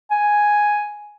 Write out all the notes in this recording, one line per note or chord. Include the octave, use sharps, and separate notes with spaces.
G#5